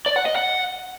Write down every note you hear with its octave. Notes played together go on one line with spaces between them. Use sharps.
D5
F#5
D#5
F#5